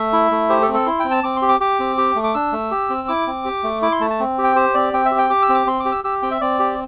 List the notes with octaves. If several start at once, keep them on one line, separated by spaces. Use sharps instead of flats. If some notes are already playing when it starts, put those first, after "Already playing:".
Already playing: A3 E5
E4
A3
G4 C5
A4
C4
A4
E4 C6
C4 G5
A5
C4 D6
C6
G4
D6
G4 D6
C4
G4
A3
D6
D4 E6
A3
G4
C4
E4 D6
C4
G4
A3
E4 D6
C6
A3 A5
A5
C4
G4
G5
G4 C5
C4 D5
C4 G5
E5
G4
G5
G4 D6
E6
C4
D6
C4 C6
D6
G4
E6
G4 E6
C4 G5
E5
C4 D5
G4